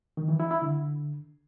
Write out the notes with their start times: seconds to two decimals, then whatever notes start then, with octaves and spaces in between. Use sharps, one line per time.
0.17 D#3
0.28 E3
0.40 E4
0.51 E4
0.62 D3